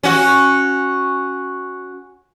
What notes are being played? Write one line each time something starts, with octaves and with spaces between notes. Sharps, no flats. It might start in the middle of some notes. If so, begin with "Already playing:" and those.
C#4 F#4